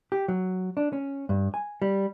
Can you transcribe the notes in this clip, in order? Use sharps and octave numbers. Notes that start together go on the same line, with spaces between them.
G4
F#3
D4
C#4
G2
G#5
G3